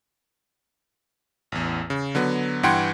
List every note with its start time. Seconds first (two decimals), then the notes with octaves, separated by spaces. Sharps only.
1.52 A1 E2
1.90 C#3
2.15 D3 F#3 B3
2.63 G2 E3 F#5 G5 C6 G#6